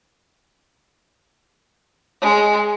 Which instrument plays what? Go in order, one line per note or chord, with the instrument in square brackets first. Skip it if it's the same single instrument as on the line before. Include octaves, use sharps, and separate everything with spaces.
[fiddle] G#3